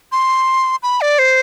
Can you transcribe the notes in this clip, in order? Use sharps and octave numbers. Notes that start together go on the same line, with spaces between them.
C6
B5
D5
C5